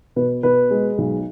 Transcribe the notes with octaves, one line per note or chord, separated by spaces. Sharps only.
B2 B4
B2 B4
G#3
B1